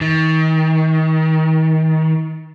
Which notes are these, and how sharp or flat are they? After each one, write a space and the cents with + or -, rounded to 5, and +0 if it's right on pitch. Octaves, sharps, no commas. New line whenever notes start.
D#3 +35